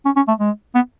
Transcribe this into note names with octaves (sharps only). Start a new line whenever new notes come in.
C#4
C#4
A3
G#3
B3